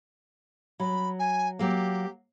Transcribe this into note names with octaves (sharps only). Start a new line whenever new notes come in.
F#3 B5
G#5
F#3 A#3 G4